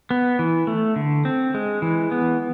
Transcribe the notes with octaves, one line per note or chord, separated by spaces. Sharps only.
B3
E3
A3
D3
C4
G#3
E3
B3